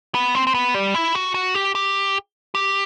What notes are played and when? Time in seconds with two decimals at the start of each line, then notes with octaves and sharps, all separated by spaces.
0.15 B3
0.35 C4
0.47 C4
0.54 B3
0.74 G3
0.95 E4
1.15 F#4
1.34 F#4
1.55 G4
1.75 G4
2.55 G4